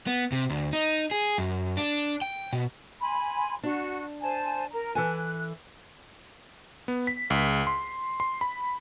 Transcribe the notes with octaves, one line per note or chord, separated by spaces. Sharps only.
B3
C3
D2
D#4
G#4
F#2
D4
G5
B2
G#5 B5 C6
D4 F#4
C5 G#5 A5
A#4 A#5
E3 A4 G#5 F#6
B3
B6
C#2
C6
C6
B5